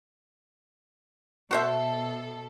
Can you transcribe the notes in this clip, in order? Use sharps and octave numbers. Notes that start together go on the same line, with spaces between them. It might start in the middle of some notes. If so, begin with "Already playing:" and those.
B2 F#4 A4 C5 E5